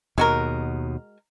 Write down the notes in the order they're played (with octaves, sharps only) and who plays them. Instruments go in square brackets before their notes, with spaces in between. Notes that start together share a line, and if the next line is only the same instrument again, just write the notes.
[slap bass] D#2 B2 [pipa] G#3 F#4 A#4